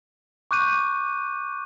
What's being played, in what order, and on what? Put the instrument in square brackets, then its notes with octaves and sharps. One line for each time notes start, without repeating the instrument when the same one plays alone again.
[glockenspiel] C#6 D6 F#6 G6 D#7